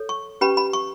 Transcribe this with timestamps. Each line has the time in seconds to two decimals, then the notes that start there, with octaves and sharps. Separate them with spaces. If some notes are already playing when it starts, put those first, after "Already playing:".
Already playing: A4 C#5
0.09 C#6
0.41 C#4 G4 B4 B5
0.57 B5
0.73 C#6